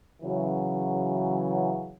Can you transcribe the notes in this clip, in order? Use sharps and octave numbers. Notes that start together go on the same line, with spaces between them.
C#3 E3 F#3